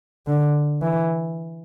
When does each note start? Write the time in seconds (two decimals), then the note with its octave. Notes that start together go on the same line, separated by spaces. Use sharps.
0.27 D3
0.82 E3